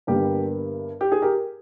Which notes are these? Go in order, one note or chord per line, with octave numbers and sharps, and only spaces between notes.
G1 G2 G3 A#3 G4
G4
G#4
G4 A#4